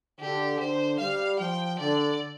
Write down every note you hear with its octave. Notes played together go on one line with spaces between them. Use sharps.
D3 G4
D3 C5
G3 F5
F3 G5
D3 D5